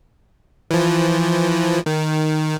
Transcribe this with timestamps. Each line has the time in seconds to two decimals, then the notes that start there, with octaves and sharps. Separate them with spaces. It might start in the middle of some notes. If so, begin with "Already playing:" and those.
0.71 E3 F3
1.86 D#3